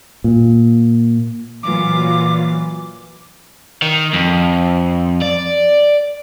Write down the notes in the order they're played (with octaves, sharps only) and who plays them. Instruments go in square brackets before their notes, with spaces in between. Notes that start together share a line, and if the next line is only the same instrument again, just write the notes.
[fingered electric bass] A#2
[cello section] A#2 F#3 F4 [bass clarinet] E3 [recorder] D6
[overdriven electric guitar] D#3
F2
D5